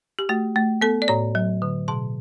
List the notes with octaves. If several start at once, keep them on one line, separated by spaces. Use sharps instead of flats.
G4
A3 F#4
A3
B3 A4
D5
A2 C#5
F#3
D3
B2 A5